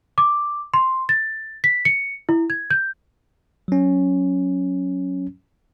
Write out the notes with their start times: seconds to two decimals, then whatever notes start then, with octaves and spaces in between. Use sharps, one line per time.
0.18 D6
0.74 C6
1.09 A6
1.64 B6
1.85 C#7
2.29 E4
2.50 G#6
2.70 G6
3.68 F#3 C#4